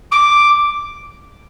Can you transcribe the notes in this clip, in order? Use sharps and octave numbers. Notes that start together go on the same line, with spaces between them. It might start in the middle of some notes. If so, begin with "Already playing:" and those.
D6